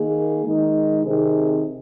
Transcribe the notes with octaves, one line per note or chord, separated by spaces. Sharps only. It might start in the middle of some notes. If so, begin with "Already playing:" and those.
Already playing: D#3 A#3 G#4
D#3 G#3 D#4
C3 D#3 C4 G#4